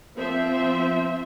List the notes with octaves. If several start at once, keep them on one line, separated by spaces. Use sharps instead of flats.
F3 C4 C5 E5